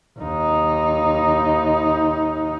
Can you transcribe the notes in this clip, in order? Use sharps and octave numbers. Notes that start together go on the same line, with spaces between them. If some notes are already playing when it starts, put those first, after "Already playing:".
D#2 D#4